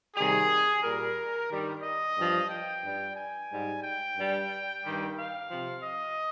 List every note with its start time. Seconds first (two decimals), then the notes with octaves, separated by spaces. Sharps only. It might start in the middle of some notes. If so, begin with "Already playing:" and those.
0.16 C3 D#3 G3 G#4
0.83 A#2 G3 A#4
1.50 G2 D#3 G3
1.82 D#5
2.17 G2 F3
2.50 G5
2.84 G2 G3
3.16 G#5
3.50 G#2 G3
3.83 G5
4.16 G2 G3
4.83 G2 D#3 G3
5.16 F5
5.49 C3 F3
5.82 D#5